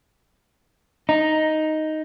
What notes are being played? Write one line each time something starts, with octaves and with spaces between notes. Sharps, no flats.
D#4